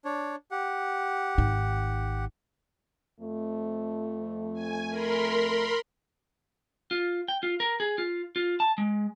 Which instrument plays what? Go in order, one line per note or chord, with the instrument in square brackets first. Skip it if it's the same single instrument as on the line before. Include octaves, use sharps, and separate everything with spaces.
[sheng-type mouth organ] D4 C#5
G4 F#5
[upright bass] G#1 D#4
[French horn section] F2 A3
[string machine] G#5
A#4 B5 C6
[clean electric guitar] F4
G5
F4
A#4
G#4
F4
F4
A5
G#3